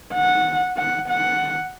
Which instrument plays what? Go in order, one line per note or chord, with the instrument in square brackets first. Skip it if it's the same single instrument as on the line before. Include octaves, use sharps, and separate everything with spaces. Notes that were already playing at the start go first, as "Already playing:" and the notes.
[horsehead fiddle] F#5
F#5
F#5